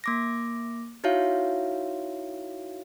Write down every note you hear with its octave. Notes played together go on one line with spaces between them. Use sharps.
A#3 D6 A#6
D#4 E4 F#4 C#5 E5 F5